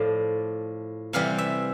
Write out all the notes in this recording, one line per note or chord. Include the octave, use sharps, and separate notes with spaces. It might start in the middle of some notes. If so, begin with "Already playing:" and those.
Already playing: A2 F3 D5
C3 E3 G3 F5
E5